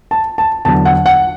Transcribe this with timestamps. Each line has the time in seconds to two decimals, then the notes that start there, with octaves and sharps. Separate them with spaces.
0.11 A5
0.38 A5
0.65 E2 D3 F#3 A5
0.85 F#5
1.06 F#5